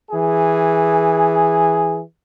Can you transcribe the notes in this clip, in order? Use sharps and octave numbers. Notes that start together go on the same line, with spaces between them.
E3 G#4